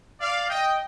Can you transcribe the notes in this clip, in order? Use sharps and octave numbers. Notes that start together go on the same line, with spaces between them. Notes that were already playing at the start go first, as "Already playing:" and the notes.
D5 F5
D#5 G5